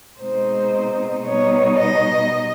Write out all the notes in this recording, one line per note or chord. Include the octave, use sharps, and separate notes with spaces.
B2 G#3 C4 D#4 C5
B2 G3 B3 D#4 C#5
D#5